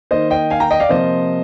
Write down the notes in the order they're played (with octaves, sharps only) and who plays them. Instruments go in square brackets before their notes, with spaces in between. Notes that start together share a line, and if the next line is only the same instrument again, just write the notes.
[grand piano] D#3 A#3 C5 D#5
D#5 G5
F5 G#5
G5 A#5
D#5 G5
D5 F5
C3 F3 A#3 C5 D#5